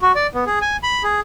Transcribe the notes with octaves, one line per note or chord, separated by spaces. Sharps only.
F#4
D5
B3
G#4
G#5
B5
G#4